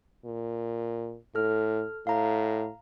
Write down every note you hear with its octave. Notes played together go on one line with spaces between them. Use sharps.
A#2
A2 A4 F6
A2 F5 A#5